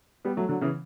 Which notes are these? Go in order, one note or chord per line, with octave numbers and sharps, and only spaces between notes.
G3 B3
F#3 A3
D3 F#3
C#3 E3